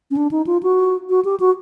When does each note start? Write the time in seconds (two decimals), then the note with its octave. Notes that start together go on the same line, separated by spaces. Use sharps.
0.11 C#4
0.17 D4
0.31 D#4
0.47 F4
0.63 F#4
1.10 F#4
1.25 G4
1.40 F#4